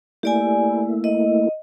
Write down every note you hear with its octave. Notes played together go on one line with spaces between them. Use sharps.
A3 A#3 E4 G4 D5 G#5
D#5